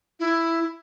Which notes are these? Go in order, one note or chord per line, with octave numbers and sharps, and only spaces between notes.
E4